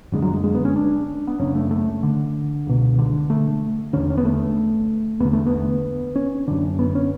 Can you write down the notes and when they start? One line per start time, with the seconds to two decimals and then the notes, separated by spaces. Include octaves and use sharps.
0.12 F#2 D3 G#3
0.22 F#3
0.34 G#3
0.44 G#3
0.55 B3
0.65 C#4
0.76 D4
1.27 B3
1.39 F#2 C#3 C#4
1.55 A3
1.71 A3
2.03 D3
2.67 C#2 B2
2.99 D3
3.30 A3
3.93 E2 D3 C#4
4.10 C#4
4.17 B3
4.25 A3
5.20 E2 D3 B3
5.33 A3
5.46 B3
6.16 C#4
6.47 F#2 D3 D4
6.79 B3
6.95 C#4